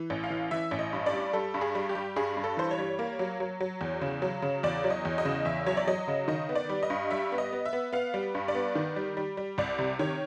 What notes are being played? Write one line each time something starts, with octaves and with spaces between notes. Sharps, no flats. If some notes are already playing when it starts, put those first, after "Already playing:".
Already playing: E3
A1
F5
E3
E3 E5
A1
D#5
G2
D5
G3
G3 A4
G2
G#4
G3
G4
G3
G2 G#4
G2
A4
E3 C5
C#5
G3
A#3
F#3
F#3
F#3
E2
C#3
F#3
C#3
E2 D5
F#3
D#5
E2
D#5
C#3
E2 E5
F#3 C#5
D5
F#3 D#5
C#3
D#3 D#5
B3
D5
G3
D#5
G2
G3 E5
B3
D#5
B3
E5
B3
B3 F5
G3
G2
D5
B3
D#3
G3
G3
G3
C2 D5
C3
D#3 C#5